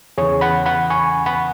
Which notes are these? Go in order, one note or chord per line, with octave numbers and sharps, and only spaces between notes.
E2 C#3 E3 G#4 C#5
F#5 B5
F#5 B5
G#5 C#6
F#5 B5